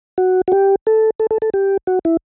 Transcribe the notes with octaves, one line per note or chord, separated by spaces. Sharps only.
F#4
F#4
G4
A4
A4
A4
A4
G4
F#4
E4